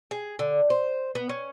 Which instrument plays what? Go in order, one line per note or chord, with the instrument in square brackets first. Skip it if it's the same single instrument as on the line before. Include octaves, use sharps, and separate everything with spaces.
[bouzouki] G#4
D3
C5
B3
C#4